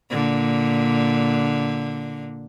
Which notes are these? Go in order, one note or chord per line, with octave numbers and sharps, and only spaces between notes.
A#2 D3